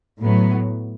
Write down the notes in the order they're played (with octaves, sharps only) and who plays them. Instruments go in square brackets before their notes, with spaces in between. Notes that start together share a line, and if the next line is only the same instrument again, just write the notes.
[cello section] A2 F#3 B3